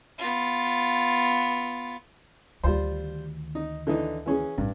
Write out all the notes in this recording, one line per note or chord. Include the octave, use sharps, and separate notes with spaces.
B3 F4
D2 D#3 G3 F4 C5
D#4
D3 E3 D#4
E3 C#4 G#4
A1 G2